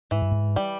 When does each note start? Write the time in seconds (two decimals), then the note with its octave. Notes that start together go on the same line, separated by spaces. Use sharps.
0.11 G#2 E3
0.22 G2
0.32 G#2
0.56 G3